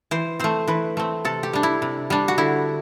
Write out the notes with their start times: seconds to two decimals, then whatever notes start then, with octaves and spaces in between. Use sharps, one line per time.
0.11 E3 C5
0.39 A3 C4 C5
0.67 E3 B4
0.97 A3 C4
1.25 C3 A4
1.43 G4
1.53 G3 D4
1.63 E4
1.82 C3
2.10 G3 D4
2.28 F#4
2.38 D3 E4